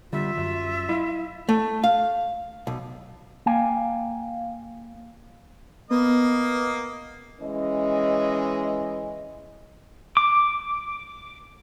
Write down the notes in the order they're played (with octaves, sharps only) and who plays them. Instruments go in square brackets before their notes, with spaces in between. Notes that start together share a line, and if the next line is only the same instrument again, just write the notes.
[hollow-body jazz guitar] D3 G3 [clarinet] F4 [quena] E5
[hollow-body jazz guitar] F#2
E4 D#5 F5
A3
F5
B1
[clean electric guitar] A#3 F5 G5 G#5
[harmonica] A#3 D#5 [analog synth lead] B3
[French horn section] E3 G#3 C#4 D#5
[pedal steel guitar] D6